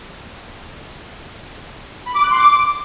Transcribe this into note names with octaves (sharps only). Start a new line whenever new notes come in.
B5
D6
F#6
C6
D6